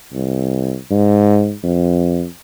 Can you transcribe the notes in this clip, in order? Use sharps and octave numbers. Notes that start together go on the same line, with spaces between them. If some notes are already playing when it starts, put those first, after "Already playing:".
C2
G#2
F2